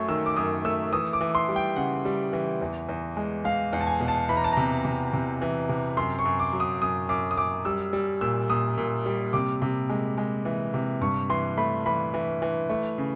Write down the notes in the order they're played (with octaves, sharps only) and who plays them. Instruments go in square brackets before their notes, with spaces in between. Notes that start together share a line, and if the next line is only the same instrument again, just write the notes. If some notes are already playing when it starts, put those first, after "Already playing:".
Already playing: [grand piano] F#2 F#3 A3 C#6
D#3 E6
D6
F#2 D#6
A3 E6
E3 D#6
D6
E3
C6
G3
G5
C#3 F#5
G3
E3
E2
E2
G#3
G#3 F5
E2
A5
G#5
B2
A5
E3 B5
A#5
A5
C3 A#5
C3
C3
E3
C3
F#2 C6
C#6
F#2
D6
F#3
D#6
F#2 D#6
F#2 D6
D#6
F#2 D6
G3 E6
G3
A#2 E6
A#2 D#6
A#2
G3
C3 D6
C3
G#3
G#3
E3
C3
G2 C#6
E3 C6
A3 B5
E3 B5
E3
E3
A3
C#3